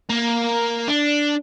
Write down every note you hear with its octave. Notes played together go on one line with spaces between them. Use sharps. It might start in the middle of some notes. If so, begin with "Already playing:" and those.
A#3
D4